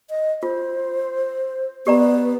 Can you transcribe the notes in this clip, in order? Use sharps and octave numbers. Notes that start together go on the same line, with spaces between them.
D#5
F4 C5
B3 G4 D5 A#5